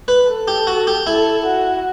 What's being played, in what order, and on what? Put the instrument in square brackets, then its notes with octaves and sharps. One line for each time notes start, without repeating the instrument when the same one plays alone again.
[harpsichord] B4
[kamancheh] A4
[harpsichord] G4
F#4
G4
[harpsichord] E4 [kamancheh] A4
[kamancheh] F#4